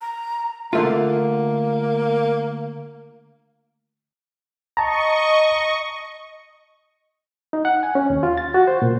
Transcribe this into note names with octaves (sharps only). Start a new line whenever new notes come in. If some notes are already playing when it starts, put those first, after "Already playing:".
A#5
D3 A3 A#3 F4
D#5 A5 A#5 C#6
D#4
F#5
G#5
C#4
D#2
F4
A6
F#4
C5
A#2